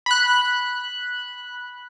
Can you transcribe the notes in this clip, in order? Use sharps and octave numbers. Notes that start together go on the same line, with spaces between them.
B5 F#6